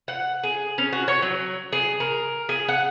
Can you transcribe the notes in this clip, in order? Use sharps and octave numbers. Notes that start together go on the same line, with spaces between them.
F#5
G#4
C#4
F#4
C#5
F#3
G#4
A#4
G#4
F#5